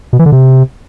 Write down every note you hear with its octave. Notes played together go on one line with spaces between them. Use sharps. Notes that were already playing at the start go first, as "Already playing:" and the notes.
B2
E3
D3
C3